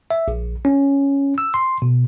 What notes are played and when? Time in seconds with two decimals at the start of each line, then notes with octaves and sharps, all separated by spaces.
0.11 E5
0.28 A#1
0.65 C#4
1.38 E6
1.54 C6
1.82 B2